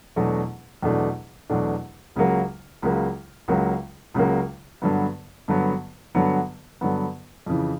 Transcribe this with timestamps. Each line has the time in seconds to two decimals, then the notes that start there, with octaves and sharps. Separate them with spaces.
0.16 E2 B2 F#3 A3 D4
0.83 E2 B2 F#3 A3 D4
1.50 E2 B2 F#3 A3 D4
2.16 C#2 C#3 F#3 A#3
2.82 C#2 C#3 F#3 A#3
3.48 C#2 C#3 F#3 A#3
4.14 C#2 C#3 F#3 A#3
4.82 G2 D3 F#3 B3
5.48 G2 D3 F#3 B3
6.15 G2 D3 F#3 B3
6.81 G2 D3 F#3 B3
7.46 F2 C#3 E3